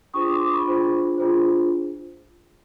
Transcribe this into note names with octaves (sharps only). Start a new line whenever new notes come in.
D4 F4 G#4 C5 C#6 D#6
C6 D6
D#6
C6 D6
B5 C#6
D4 F4 G#4 C5
D4 F4 G#4 C5